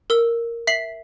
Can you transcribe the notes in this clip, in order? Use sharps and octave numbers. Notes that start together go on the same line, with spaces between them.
A#4 E6
E5 B6 C7 F#7